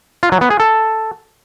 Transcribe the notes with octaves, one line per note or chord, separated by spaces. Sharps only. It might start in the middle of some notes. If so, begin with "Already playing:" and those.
F4
F#3
B3
G#4
A4